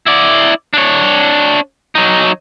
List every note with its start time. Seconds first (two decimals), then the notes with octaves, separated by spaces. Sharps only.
0.06 E4 D5
0.74 D4 C#5
1.95 F#3 D#4